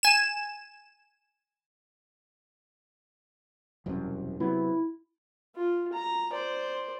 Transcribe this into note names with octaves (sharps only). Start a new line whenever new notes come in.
G#5 E7
E1 C2 F#2
C3 F#3 B3 E4
F4
A#5
C5 D5